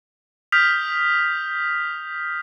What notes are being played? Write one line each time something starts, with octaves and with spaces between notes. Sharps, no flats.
D#6 F6 G6 B6 F7